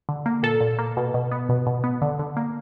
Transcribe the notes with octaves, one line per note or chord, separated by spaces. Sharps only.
D3
A#3
A#2 A4
A#2
A#3
B2
B2
B3
B2
B2
B3
D3
D3
A#3